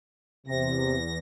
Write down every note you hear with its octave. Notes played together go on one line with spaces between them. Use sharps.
E2 C3 A#6